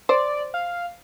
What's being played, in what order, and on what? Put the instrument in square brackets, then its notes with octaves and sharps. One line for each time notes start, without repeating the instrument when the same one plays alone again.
[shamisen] C5 [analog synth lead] D5
[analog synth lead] F5